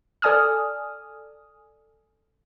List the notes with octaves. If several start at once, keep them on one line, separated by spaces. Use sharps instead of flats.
A4 D5 G#5 D#6 F6